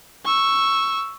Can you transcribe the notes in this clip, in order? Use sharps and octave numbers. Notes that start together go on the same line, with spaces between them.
C#6 E6